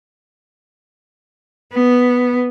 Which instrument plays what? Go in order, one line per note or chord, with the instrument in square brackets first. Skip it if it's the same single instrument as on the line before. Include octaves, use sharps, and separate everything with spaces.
[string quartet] B3